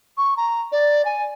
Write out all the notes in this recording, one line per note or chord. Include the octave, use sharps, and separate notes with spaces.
C#6
A#5
D5
G#5